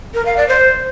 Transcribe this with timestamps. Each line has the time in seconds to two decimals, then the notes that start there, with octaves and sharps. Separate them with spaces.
0.14 A#4
0.26 F5
0.37 D5
0.48 C5